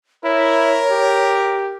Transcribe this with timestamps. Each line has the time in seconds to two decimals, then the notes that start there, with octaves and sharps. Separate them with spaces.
0.24 E4 A#4 C#5
0.91 G4